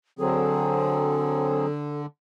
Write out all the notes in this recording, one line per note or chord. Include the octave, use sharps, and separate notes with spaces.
D3 F#3 C4 G#4 A4